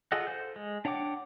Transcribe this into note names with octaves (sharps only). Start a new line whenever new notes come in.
F4 G#4 A4 D#5 F#5
A4 C5 G6
G#3
D4 C#5 F#5 G5 D6